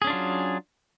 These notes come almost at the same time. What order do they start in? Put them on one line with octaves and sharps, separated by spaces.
G#4 C#4 D4 F4 F#3